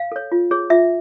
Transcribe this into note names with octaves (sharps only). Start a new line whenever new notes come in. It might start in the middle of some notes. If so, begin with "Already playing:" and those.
Already playing: F5
A4 C#5
F4
G#4 C#5
F4 E5